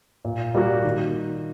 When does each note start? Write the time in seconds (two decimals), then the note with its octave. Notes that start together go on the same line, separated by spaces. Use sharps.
0.25 A#2
0.55 G3 A#3 F#4
0.84 D#3